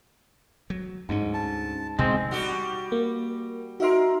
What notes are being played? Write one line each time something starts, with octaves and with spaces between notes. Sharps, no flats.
F#3
D2 G#2 C#4
A5
A1 B2 G#3 C4
G3 F#4 G4
A#3
D#4 F#4 A#4 E5 C6